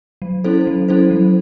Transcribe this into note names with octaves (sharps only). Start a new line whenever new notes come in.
F#3
C#4 E4 A4 C5
F#3
C#4 E4 A4 C5
F#3